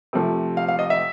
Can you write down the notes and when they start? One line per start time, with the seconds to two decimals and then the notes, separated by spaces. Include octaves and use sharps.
0.13 C3 F3 A3
0.57 F5
0.68 F5
0.79 D#5
0.90 E5